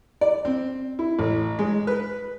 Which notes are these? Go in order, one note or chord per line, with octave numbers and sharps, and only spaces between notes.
D5
C4
E4
A1
G#3
B4